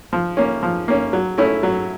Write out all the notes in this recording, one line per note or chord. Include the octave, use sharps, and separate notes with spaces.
F3
A#3 C#4
F3
A#3 C#4
F#3
A3 C#4 E4
F#3